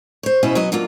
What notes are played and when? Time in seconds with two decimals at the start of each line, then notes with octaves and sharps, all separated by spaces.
0.23 C5 C#5
0.43 B2 C#4 E4 C5 D#5 E5
0.55 F#3 B3 F#4 D#5
0.72 D3 F#3 A#3 F4